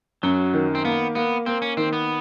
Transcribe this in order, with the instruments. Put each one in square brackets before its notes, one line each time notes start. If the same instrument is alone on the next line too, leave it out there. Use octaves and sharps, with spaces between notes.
[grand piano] F#2 [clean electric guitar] F#3
[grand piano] D#3
[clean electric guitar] C4
[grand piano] A#3 [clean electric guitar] B3
[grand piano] A#3 [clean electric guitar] B3
[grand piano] A#3 [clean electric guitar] C4
[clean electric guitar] C#4
[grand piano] D#3 [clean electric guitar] C4
[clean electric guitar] B3